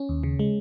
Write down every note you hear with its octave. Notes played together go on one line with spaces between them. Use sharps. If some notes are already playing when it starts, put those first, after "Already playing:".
Already playing: C#4
D#2
C#3
G#3